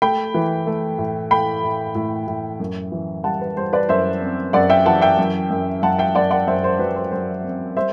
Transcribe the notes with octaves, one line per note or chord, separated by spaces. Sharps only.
A3 G5 B5
E3
A3
A2
A3 G5 B5
A2
A2
A2
F#2
E3
G3 F#5 A5
B4
G3 C5
B4 D5
F#2 C5 E5
C4
F#2 D5 F#5
E5 G5
E3 F#5 A5
E5 G5
F#2
F#2
F#2 F#5 A5
E5 G5
F#2 D5 F#5
D5 F#5
F#2 C5 E5
C5
F#3 B4
C5
F#2 C5
C4
G3 C5 E5